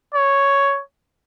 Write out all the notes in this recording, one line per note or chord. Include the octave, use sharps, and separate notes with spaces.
C#5